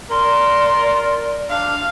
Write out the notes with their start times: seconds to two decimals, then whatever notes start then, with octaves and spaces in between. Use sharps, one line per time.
0.11 A#4 D5 C6
1.50 D4 F5